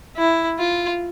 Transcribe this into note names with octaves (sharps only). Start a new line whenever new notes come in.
E4
F4